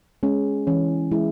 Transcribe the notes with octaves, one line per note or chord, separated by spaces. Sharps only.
G#3 C#4
E3 C#4
G#3 E4